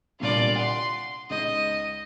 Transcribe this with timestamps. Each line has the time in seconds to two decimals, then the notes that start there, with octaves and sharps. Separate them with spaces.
0.20 C2 A#2 D3 F4 D5
0.56 F#5 C6
1.30 C#2 D#4 D#5 G6